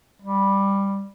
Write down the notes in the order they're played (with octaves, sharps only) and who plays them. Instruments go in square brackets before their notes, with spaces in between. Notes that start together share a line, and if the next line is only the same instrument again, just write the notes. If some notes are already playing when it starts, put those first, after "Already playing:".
[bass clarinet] G3